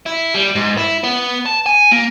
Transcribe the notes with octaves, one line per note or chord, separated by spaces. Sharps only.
E4
G3
G#2
E4
B3
A5
G#5
A#3